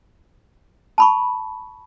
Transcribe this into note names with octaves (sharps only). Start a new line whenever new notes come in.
A5 B5 C#6